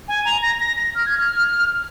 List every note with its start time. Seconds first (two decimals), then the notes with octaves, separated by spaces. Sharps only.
0.08 G#5
0.25 A#5
0.42 A#6
0.60 A#6
0.78 A#6
0.95 F6
1.06 G#6
1.18 F6